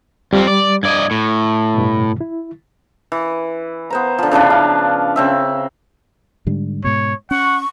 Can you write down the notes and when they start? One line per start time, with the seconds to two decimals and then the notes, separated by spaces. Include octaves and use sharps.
0.33 F2 F3 G3 C4
0.48 D5
0.83 G2 D5 D#5 G#6
1.11 A2
1.74 G2 B2
2.21 E4
3.12 E3
3.90 B3 C5 A#5
4.19 D3 F3
4.31 C#3 E3 F3 D4
4.50 F5
5.16 C#3 C4 E5
6.47 G#2 D3 G3
6.84 G#2 B2 C#5
7.31 C#4 F#5 C#6